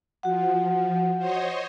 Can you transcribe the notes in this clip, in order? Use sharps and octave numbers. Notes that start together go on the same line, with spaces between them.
F3 F#4 F#5
C5 C#5 D#5